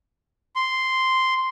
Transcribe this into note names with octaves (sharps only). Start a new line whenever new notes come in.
C6